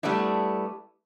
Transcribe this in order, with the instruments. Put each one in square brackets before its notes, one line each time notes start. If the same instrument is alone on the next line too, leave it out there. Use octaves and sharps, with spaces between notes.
[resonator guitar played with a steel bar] G3 A3 B3 D4 E4